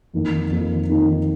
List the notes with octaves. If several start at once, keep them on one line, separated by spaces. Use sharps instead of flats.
F2 D#3 A#3 D#4
F2 D#3 A#3 D#4
F2 D#3 A#3 D#4